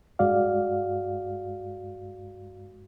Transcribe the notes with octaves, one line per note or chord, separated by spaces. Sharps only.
G2 G#3 F#4 D5 F5